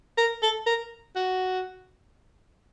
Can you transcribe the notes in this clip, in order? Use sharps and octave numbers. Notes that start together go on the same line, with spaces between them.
A#4
A4
A#4
F#4